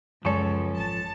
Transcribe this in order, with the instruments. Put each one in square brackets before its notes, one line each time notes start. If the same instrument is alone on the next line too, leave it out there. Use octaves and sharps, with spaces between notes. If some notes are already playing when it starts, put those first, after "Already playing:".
[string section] C#2 [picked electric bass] F#2 [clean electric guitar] F3 A4 [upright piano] C#5 G#5 C#6
[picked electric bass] G#1 [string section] A5